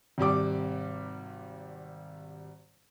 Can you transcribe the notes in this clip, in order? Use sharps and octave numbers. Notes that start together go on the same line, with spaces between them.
G#1 C3 G3 D6